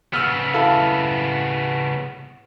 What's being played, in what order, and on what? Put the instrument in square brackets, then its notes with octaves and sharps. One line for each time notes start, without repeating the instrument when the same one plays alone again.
[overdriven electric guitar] C#3 B3 [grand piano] E6 F6
[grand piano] E4 A4 F5